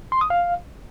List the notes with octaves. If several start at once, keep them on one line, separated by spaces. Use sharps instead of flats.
C6
D#6
F5